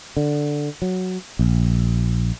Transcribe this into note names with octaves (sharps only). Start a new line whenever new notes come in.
D3
F#3
A#1